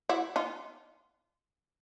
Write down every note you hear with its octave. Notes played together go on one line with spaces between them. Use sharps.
E4 F#4
D#4 F4